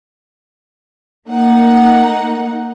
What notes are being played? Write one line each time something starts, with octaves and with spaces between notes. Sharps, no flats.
A3 A#3 D#4 F#5